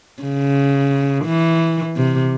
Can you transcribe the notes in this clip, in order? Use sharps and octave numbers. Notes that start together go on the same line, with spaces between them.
C#3
E3
C3